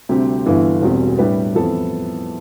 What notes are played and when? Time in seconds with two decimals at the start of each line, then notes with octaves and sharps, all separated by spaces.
0.09 D2 C3 G3 C4 G4
0.45 G1 G2 E3 B3 E4
0.82 E1 E2 B2 G3 C4
1.19 A2 G3 D4 G4 B4
1.55 F2 E3 B3 E4 A4